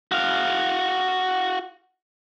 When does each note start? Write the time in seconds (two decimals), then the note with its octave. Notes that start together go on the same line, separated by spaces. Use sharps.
0.12 F#4 F5